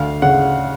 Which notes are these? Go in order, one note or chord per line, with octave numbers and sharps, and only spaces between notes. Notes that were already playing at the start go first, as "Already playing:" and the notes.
Already playing: D2 F5
C#3 F#5